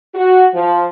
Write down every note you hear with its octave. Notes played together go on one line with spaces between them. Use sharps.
F#4
F3